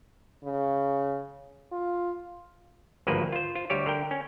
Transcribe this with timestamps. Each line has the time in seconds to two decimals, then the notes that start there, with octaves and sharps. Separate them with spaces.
0.44 C#3
1.72 F4
3.07 G#1 D2 G2 F3 A#3 B4
3.32 F4 C5
3.56 F4
3.70 D2 G3 G4 C#5
3.86 D3 A#4 G5
4.11 C#4